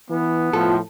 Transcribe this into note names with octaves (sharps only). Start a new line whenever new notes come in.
E3 B3
A2 F3 F4 A4